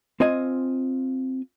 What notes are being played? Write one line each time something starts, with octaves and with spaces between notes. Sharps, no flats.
C4 F4 D#5 G#5